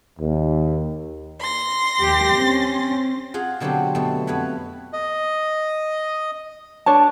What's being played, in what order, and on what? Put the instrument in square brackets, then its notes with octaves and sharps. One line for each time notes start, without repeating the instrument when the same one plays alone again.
[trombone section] D#2
[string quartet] C6 A#6
[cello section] D#2 G4
C4 C#4
[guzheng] F4 G#4 F#5
B2 D3 F#3 C4 D4 G4
B2 A3
F2 B4 C#5 F#5 B5
[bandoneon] D#5
[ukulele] D4 C#5 A5